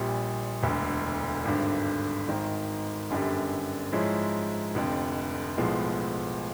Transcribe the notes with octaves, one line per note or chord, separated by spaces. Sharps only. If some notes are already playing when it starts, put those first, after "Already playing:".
Already playing: A#1 A#2 G3
E1 D2 D3
G#1 G2 D3
G#1 G#2 D#3
G1 F#2 D3 G3
G#2 F3 G#3 C#4 E4
F1 F2 D3
B1 A2 F3 G#3 B3